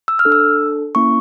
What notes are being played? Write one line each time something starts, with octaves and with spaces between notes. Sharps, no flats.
E6
F6
D4 A4
E6
A#3 C#4 E4 C#6